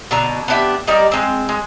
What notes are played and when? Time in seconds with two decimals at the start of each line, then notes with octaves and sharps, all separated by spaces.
0.11 B2 D3 A#5
0.48 B3 D4 G4 E5
0.87 G3 D#4 A#4 D5
1.12 G#3 C4
1.49 G#3